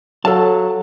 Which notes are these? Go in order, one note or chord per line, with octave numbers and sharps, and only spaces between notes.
F#3 A4 F5 A5